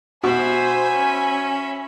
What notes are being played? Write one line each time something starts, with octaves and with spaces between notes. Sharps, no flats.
B2 C5 E5 G#5 B5
C#4